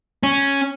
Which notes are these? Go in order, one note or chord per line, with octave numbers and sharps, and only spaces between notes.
C#4